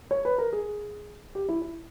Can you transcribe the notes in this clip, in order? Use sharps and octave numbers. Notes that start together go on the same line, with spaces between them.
C#5
B4
A#4
G#4
G4
E4
E4